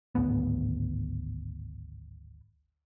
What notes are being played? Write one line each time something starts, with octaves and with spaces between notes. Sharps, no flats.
D1 G#1 D2 B3